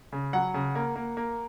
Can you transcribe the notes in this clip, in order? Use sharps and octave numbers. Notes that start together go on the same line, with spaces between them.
C#3
F#3 F#5
C#3
A#3
A#3
A#3